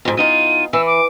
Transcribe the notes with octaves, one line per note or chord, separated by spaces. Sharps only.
F2 G#2
E2 D#4 F4 D#7
E3 E6
D6